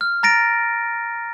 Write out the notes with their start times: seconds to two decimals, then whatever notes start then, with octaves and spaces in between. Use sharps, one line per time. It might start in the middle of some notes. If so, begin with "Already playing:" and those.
0.01 F6
0.23 A#5 A6 A#6 D7